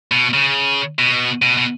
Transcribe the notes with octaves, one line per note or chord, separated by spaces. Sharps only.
B2
C#3
B2
B2
B2